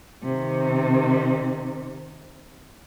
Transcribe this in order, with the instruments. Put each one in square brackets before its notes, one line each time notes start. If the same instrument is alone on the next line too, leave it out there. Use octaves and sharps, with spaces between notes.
[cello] C3 D#3